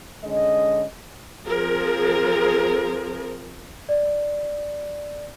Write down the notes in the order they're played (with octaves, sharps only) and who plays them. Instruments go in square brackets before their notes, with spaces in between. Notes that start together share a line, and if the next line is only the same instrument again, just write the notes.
[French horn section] D3 G#3 C#4 D#5
[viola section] F3 C4 G#4 A#4
[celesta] D5